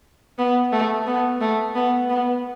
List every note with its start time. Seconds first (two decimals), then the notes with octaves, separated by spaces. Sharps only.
0.38 B3
0.72 A3
1.07 B3
1.41 A3
1.75 B3
2.10 B3